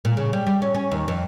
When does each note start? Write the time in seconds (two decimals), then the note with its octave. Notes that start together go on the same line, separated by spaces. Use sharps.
0.05 A#2
0.17 C#3
0.33 G3
0.47 G3
0.62 C#4
0.75 C#4
0.91 D#2
1.08 F2